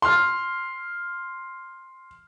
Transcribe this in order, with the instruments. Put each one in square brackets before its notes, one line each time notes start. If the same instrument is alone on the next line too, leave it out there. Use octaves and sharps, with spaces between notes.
[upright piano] C6 F6